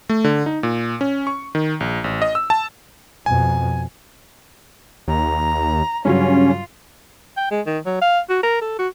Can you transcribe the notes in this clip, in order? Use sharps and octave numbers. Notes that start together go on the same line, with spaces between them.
A3
D3
D#4
A#2
C#4
C#6
D#3
A#1
A1
D#5
E6
A5
F2 B2 G#5
D#2 A#5
G2 C#3 F#3 C#4 F4
G5
G#3
D#3
F#3
F5
F#4
A#4
A4
F#4